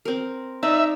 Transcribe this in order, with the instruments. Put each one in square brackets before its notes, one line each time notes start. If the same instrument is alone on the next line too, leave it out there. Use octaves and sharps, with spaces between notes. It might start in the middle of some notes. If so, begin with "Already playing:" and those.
[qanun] C4 A#4
[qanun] D#4 D5 [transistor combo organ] E5